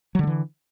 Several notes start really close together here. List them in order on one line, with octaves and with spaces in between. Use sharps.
F#3 D3 G3 E3